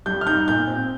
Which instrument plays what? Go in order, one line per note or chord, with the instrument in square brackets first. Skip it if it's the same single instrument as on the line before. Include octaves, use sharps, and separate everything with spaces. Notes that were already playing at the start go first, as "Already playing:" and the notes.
[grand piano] G3 [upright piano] G6
[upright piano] F6
[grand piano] D#4 [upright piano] G6
[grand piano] A#2 [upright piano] G6
[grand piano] C4